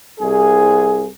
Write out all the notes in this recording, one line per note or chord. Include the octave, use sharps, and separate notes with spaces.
C2 G#4